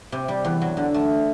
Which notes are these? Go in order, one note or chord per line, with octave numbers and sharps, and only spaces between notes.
C3
G3
E2
F#3
D3
A3